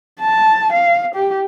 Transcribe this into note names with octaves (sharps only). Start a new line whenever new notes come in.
A5
F5
G4